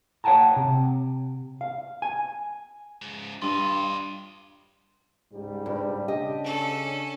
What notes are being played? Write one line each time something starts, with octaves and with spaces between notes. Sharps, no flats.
C#5 F#5 G5 A5 A#5
C3
F5
G#5
C#2 G#2
G2 F4 D#5 C6
C#2 G#2 G3
G2
C#3 D4 G4 D#5
C#4 A4